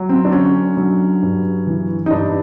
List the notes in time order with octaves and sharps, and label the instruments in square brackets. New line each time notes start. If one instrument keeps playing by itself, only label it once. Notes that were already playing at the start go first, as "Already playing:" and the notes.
Already playing: [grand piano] F#3
C4
D4
D3 C#4
F#3
G2
E3
D#4
G2 D4